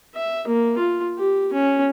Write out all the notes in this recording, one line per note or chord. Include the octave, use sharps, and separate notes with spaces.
E5
A#3
F4
G4
C#4